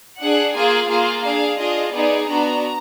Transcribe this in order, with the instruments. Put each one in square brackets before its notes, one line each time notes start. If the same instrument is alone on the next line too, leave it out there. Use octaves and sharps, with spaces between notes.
[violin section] D4 G#4 F#5
A#3 F4 G#4 G#5
A#3 F4 G#4 F5
D4 G#4 F5
D4 F4 G#4 D#5
B3 D#4 G#4 D5
B3 D4 F#4 A#5